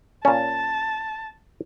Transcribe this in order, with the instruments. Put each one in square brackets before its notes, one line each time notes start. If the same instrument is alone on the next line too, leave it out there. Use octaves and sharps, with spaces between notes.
[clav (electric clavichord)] A#2 C#4 [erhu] A5